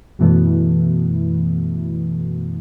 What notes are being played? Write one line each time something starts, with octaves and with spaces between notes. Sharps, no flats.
F#2 B2 E3 A3 B3